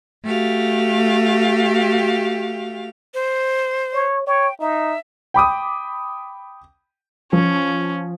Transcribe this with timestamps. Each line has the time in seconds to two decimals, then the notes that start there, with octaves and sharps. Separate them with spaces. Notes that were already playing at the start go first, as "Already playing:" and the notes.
0.25 A3 F#4 G4 F5
3.14 C5
3.94 C#5
4.27 C#5 G5
4.60 D#4 E5
5.34 G5 B5 D6 D#6
7.33 F3 C#4